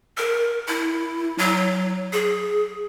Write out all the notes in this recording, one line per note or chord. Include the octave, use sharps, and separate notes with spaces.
A#4
E4
F#3
G#4